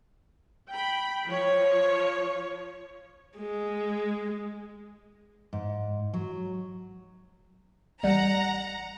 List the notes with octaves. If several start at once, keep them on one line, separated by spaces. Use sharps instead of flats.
G5 B5
F3 C#5
G#3
G#2
F#3
A1 G3 F#5 A#5